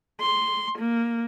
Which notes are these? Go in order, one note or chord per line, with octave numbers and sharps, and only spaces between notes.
C6
A#3